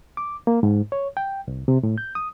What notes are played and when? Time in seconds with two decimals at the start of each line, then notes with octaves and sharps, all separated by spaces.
0.17 D6
0.47 A#3
0.63 G#2
0.92 C#5
1.17 G5
1.48 C2
1.68 C3
1.83 A2
1.98 G6
2.15 D#6